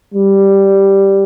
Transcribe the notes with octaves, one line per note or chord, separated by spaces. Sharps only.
G3